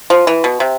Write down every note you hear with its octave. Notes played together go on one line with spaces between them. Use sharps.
F3
E3
B2
C3